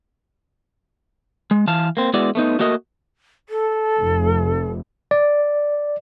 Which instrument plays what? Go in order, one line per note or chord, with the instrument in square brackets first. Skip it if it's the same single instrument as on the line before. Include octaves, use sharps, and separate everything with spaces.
[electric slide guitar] G#3
E3 F5 A5
A#3 C4
G#3 B3 E4 F#4 D5
A3 B3 D#4
A3 A#3 F#4 A#4 D#5
[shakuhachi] A4
[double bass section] F1
[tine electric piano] D5